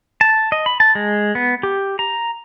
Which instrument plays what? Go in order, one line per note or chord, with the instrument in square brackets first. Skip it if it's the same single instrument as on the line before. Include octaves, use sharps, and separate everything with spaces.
[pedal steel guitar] A5
D#5
B5
A5
G#3
B3
G4
A#5